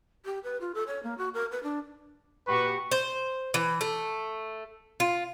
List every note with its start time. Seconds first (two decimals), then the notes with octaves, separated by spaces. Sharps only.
0.25 G4
0.44 B4
0.61 F4
0.75 A4
0.87 C#5
1.03 A#3
1.18 F#4
1.34 A#4
1.51 B4
1.63 D4
2.47 A#2 F#4 G4 B4 C#6
2.91 C5
3.54 E3
3.81 A3
5.00 F4